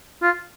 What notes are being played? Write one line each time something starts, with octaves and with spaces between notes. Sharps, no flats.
F4